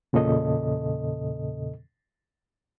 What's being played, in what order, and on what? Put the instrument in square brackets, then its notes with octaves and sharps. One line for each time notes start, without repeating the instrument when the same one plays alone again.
[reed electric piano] E2 A#2 C#3 A4 D#5